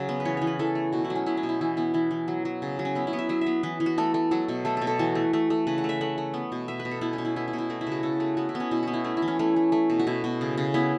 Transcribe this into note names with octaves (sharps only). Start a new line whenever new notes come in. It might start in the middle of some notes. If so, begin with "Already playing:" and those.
Already playing: C#3 F#3
B3
B4
E3 C#5
E3 C#5
B4
E3 A4
A3
B2 F#4
E4
F#3
C#4
B3 E4
C#4
B2
E4
E3 E4
B3 E4
E3 E4
E3
F#3
F#3
C#3
F#3
C#4
B3 E4
E4
B3
E5
F#3 E5
E5
B3
E3 B4
E3
F#4
A3 A4
A3
F#3 A4
B2
A3 A4
B2 A4
A4
E3 F#4
A3
A3
A3
C#3 B4
F#5
A3
E5
A3 F#5
A3
B3
B2
B2 E5
B4
B2
A4
B2 E4
C#4
B2
E4
B3 E4
E4
B2
E4
A3 F#4
E4
C#3
F#4
C#3 A4
A3 F#4
B3 F#4
E4
B3
C#4
B2 E4
B3 F#4
E4
A3 C#4
E4
E3
C#4
A3 C#4
A3
A3
B2
F#4
B2 E4
B2
C#3
C#3
B3 E4